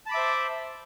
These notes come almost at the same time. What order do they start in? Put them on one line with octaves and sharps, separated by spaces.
A5 B5 D6 E5 C5